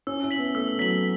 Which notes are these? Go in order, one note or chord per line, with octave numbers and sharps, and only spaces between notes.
C#4 E6
E4
B6 F#7
B3
A3 E6
F#3 B6 F#7